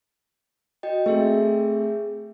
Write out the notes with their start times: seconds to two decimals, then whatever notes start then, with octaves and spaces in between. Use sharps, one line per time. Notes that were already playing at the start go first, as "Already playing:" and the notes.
0.83 F#4 D#5 G5
1.06 A3 C4 G#4 E5